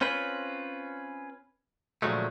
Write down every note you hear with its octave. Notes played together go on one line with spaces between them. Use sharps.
C4 C#4 F4 B4
A#2 D3 F3 F#3 G#3 A3